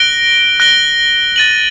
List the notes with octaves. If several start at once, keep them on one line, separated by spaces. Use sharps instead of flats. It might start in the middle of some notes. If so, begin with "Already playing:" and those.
Already playing: F#6 A#6 D7 G7
F#6 A#6 D7 G7
A6 D#7 F#7